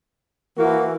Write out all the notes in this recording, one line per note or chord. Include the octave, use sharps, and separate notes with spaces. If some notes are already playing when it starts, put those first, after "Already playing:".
E3 A#3 F#4